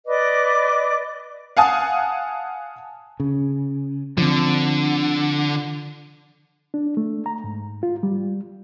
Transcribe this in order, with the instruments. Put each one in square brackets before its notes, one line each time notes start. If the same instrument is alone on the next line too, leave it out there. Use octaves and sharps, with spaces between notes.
[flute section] B4 D5 D#5 D6
[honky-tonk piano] F5 F#5 G#5 A5 D#6
[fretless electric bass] C#3
[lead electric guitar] D3 [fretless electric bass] F3 C4
[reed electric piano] D4
A3
A#5
G#2
F4
G3